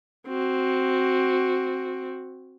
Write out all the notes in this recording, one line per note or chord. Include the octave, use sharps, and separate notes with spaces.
C4 F#4